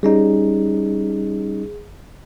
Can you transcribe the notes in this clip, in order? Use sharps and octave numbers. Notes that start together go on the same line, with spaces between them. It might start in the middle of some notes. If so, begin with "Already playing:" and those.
G3 C#4 D#4 G#4